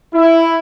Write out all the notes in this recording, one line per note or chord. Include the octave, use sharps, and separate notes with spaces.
E4